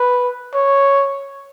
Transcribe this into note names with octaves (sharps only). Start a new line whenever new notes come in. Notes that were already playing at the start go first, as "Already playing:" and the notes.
Already playing: B4
C#5